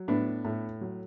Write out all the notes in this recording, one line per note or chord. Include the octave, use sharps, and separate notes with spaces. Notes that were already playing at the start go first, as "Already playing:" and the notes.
Already playing: F#3
A2 B3 D4
A2
F#3